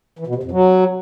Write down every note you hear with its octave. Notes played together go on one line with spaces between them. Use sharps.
E3
B2
C3
F2
F#3